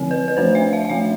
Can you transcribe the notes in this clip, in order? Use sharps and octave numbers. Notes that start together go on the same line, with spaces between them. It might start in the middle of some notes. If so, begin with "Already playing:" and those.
Already playing: D3 F3 C4
B4
B4
F3 A3 D4 C5
E5
F5
F5
F3 A3 D4 E5